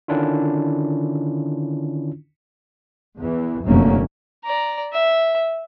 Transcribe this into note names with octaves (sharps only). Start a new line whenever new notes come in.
D3 D#3 C#4 D4 E4 F4
E2 E3
F1 F#2 D3 A3 A#3 C#4
D5 A#5
E5